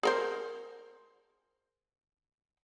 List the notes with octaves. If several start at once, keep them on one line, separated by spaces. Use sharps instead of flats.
G#4 A#4 C5